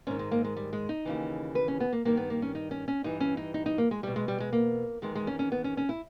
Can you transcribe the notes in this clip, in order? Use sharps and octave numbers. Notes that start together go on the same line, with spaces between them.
G#2 D#3 C#4
G#3
A#3
G#3
G3
G#3
D#4
D#2 C#3 E3
B4
C#4
B3
A#3
G2 D#3 A#3
B3
A#3
C#4
D#4
C#4
C#4
G2 E3 D#4
C#4
D#4
D#4
D#4
A#3
G#3
E2 B2 G3
G#3
G3
G#3
A#3
E2 D#3 G#3
G#3
C#4
C#4
B3
C#4
C#4
E4